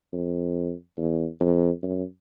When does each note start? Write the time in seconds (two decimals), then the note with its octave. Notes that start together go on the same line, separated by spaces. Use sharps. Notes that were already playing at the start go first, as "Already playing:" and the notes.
0.13 F2
0.97 E2
1.40 F2
1.83 F#2